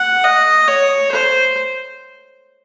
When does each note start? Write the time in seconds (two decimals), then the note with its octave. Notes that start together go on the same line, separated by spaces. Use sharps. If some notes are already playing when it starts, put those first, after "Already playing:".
Already playing: F#5
0.24 D#5
0.68 C#5
1.11 C5